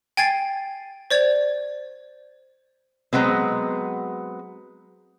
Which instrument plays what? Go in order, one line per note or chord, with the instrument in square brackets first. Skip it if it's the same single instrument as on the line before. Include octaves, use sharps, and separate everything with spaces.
[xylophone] G5 G#5 G#6 A6 C7
C5 D5 G#6
[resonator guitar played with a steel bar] F#3 G#3 B3 C4